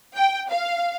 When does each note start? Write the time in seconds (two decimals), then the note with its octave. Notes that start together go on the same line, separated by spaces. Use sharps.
0.15 G5
0.49 F5